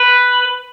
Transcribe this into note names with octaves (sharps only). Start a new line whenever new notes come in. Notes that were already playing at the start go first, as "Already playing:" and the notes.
Already playing: B4